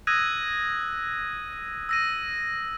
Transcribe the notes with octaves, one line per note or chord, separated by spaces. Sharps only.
D#6 E6 F#6 G#6 A#6 D#7
E6 A#6 D#7